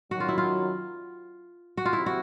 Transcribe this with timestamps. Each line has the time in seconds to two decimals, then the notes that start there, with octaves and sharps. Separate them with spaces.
0.11 F#2 D#3 F#3 F#4
0.20 F4
0.28 E4
0.38 F4
1.77 F#4
1.85 F4
1.92 C3 E4
2.06 F#4